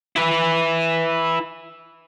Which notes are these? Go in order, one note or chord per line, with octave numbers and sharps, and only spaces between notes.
E4 B4